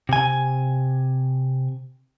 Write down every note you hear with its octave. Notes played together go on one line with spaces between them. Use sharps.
C3 G#5